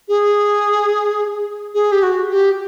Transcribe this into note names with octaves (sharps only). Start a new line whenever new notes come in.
G#4
G#4
G4
F#4
G4